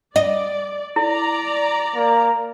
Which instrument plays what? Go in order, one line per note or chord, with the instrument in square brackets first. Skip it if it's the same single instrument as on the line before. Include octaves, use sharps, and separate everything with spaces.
[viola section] D5 [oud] D#5
[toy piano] E4 [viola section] D5 A#5
[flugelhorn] A#3